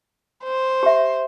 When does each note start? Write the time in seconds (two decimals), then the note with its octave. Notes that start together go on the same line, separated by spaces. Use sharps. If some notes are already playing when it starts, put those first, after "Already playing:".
0.44 C5
0.83 G4 E5